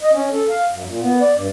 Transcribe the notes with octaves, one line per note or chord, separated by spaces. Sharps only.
D#5
C#4
A4
F5
F#2
A#2
B3
D5
G2